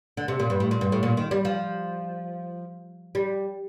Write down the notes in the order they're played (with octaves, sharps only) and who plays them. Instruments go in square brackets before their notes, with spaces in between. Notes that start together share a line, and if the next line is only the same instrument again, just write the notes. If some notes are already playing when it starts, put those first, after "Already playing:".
[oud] D3
C3
A#2
G2
A2
A#2
G2
A2
A#2
D#3
G3
F3
G3